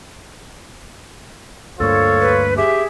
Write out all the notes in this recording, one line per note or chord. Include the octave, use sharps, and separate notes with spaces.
D2 G2 A#3 F4 A4 C5 C#5
B4
G4 G#4 E5